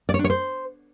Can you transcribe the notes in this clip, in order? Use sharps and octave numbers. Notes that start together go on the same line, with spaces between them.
D5
C#5
D4
C#5
C5